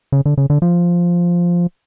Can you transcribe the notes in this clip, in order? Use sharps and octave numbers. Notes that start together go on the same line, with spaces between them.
C#3
D3
C#3
D3
F3